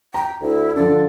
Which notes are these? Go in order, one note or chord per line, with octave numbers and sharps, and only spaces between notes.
G5 A#5
D2 E4
D3 F3 A4 D5